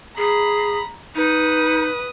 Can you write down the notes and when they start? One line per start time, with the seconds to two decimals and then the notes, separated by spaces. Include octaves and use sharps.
0.17 G#4 A#5 B5
1.15 D#4 B4 D#6